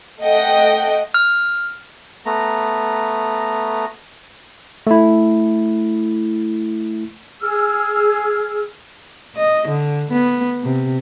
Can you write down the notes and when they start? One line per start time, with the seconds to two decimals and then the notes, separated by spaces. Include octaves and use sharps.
0.22 A3 D#5 F#5 G5
1.14 F6
2.26 A3 B3 A#5
4.87 A3 E4
7.41 G#4 E6 F6
9.36 D#5
9.68 D3
10.12 B3
10.64 C3